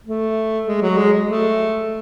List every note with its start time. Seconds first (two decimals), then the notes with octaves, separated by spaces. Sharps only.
0.06 A3
0.67 G#3
0.82 F#3
0.97 G#3
1.27 A3